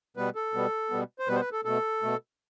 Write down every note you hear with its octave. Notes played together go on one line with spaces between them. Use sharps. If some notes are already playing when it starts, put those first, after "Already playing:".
B2 G3 B3 B4
A4
B2 G3 B3
B2 G3 B3
C5
B2 G3 B3 B4
C5
B4
A4
B2 A3 A4
B2 A3